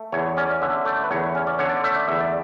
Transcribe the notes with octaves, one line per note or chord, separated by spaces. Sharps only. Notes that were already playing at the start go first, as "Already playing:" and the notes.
Already playing: A3
E2 C#5
C#4 D5
D3 E5
A3 D5
B4
E2 C#5
C#4
D5
D3 C#5
D5
A3 E5
D5
E2 E5
D5